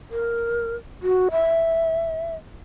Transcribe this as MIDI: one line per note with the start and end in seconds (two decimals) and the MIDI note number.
0.11 0.76 70
1.02 1.28 66
1.31 2.35 76